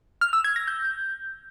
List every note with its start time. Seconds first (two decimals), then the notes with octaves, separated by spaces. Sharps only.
0.21 F6
0.33 E6
0.44 G#6
0.56 A#6
0.67 G6